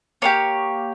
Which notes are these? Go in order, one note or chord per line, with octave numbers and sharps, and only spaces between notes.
A#3 D4 G4 C#5